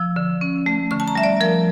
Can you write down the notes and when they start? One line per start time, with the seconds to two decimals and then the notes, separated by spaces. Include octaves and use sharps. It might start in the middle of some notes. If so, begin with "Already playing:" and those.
Already playing: F3 E6
0.16 D3
0.41 C#4
0.66 A3
0.91 D3 C#6
1.00 A5
1.08 A#5
1.15 G3 E5
1.24 D5
1.40 F3 A#4